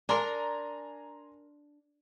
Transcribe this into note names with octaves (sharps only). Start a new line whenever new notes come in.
D4 A#4 G#5 A#5 C6